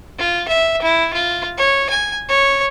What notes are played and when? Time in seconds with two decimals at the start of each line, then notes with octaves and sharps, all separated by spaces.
0.19 F4
0.48 E5
0.82 E4
1.14 F4
1.57 C#5
1.90 G#5
2.29 C#5